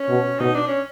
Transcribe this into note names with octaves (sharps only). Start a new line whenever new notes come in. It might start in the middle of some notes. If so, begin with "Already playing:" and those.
Already playing: C#4
B2
B2 D#4
D4
C#4